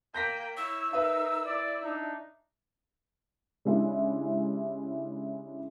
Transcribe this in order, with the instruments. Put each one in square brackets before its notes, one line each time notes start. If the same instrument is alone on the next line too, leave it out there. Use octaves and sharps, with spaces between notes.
[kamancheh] A#3 G5 [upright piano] G6 A#6 B6
[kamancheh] E4 C#5 [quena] E6
[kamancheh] D#4 A#4 [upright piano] B4 E5
[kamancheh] E4 [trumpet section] D5
[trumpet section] D4 D#4
[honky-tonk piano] C#3 G3 G#3 D4 E4